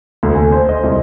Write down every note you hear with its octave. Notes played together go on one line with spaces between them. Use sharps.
D2
G#5
C5
D#5
C2